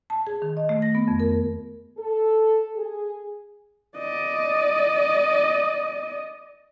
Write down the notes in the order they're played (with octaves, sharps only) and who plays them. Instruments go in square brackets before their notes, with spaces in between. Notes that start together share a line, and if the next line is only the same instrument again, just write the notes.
[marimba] A5
G#4
D#3
D#5
A3
A#6
B3
F2
A#4
[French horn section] A4
G#4
[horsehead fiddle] D5 D#5